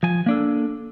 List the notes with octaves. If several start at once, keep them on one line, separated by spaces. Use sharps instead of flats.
F3 G#5
A#3 D4 A4